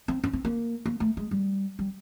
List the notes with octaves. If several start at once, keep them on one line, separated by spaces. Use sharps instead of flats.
C4
C#4
C4
A#3
A#3
A3
G#3
G3
G3